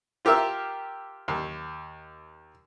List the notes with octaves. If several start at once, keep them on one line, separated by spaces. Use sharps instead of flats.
F4 G4 A#4 E5
D#2